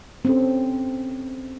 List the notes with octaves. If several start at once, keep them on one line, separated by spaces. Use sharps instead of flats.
C4 C#4 A4